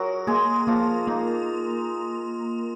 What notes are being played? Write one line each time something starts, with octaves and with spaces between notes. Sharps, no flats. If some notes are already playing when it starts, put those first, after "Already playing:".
Already playing: F#3 F#4 G#4 A#4
G#3 A#3 G#4
F3 A#3 F4
A#3 D#4